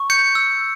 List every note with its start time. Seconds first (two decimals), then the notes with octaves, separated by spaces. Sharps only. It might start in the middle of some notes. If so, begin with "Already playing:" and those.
Already playing: C#6
0.10 G6 C#7
0.35 E6